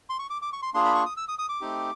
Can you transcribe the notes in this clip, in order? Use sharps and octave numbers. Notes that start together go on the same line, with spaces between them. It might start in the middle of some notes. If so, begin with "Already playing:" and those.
C6
C#6
D6
D6
C#6
C6
A#3 D4 F4 G#4 C6
B5
C#6
D#6
E6
D#6
D#6
D6
A3 C4 D#4 G4